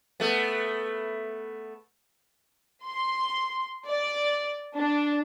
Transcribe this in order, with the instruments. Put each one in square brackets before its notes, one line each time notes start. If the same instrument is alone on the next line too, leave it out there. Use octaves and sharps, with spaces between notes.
[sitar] A3 B3
[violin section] C6
D5
D4